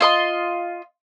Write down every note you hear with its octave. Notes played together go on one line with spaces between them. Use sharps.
F4 D#5 C6